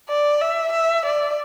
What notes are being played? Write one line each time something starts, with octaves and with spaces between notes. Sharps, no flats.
D5
E5
E5
D5